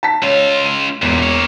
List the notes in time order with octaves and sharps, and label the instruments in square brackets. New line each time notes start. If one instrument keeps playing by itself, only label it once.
[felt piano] A5 B6
[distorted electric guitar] C#2 F4 [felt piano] C#5
[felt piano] D#7
[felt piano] E1 [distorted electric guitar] E2 A#2
[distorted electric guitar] A#3 C#5